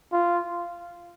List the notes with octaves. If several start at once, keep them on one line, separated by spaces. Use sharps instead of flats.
F4